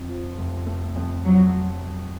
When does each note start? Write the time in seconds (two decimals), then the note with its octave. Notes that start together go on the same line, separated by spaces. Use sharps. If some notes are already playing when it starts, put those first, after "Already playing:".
Already playing: F2
0.09 F3
0.38 F1
0.67 A3
0.96 F2
1.25 F3 F#3